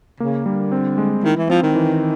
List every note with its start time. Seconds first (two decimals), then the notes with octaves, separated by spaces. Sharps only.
0.20 C#3 A#3
0.46 D3 G3
0.72 C4
0.98 G#3
1.24 D#3 E4
1.37 E3
1.49 F3 C4
1.63 D#3
1.75 E3